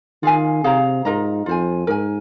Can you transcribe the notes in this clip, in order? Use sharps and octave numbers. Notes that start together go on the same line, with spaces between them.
D#3 F4 G#4 F5 G#5
C3 G#4 C5 F5 A#5
G#2 F4 A#4 D#5 A#5
F2 F4 C5 G#5
G#2 A#4 G#5